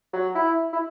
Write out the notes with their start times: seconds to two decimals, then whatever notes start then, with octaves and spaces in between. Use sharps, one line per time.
0.13 F#3
0.35 E4
0.73 E4